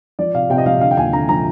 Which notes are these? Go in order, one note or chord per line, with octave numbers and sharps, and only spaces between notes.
F3 D5
C3 F5
C3 G5
D#5
F3 F5
D3 F5
G5
D#2 G#5
D3 A#5
F3 A#5